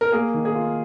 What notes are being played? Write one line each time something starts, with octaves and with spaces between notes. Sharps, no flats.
A#4
A#3 G#4
D#3
G#4
F4